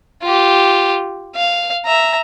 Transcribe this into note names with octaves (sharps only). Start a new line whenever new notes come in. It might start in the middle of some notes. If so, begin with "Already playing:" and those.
F4 G4
F5
E5 A#5